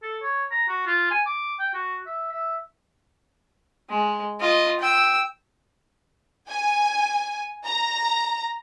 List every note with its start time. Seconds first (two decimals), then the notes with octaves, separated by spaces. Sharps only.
0.03 A4
0.22 C#5
0.51 A#5
0.68 F#4
0.87 F4
1.11 G#5
1.26 D6
1.59 G5
1.74 F#4
2.06 E5
2.32 E5
3.90 G#3
4.40 F4 D#5
4.79 G5 E6
6.49 G#5
7.65 A#5